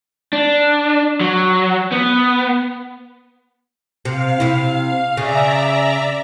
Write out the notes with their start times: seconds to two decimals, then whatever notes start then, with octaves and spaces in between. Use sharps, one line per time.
0.33 D4
1.21 F#3
1.92 B3
4.05 C3 F5
4.40 C3 E4
5.17 C#3 D5 E5 A#5